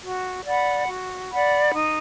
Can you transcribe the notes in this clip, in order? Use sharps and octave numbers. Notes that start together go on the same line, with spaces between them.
F#4
D5 F#5 B5
F#4
D5 F#5 B5
D#4